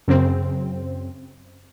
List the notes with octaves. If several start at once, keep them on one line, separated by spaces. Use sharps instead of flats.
F#2 C#3 C4